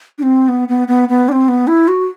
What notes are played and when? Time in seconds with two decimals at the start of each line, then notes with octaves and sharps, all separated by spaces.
0.18 D4
0.23 C4
0.48 B3
0.69 B3
0.88 B3
1.09 B3
1.29 D4
1.32 C4
1.48 B3
1.67 E4
1.88 F#4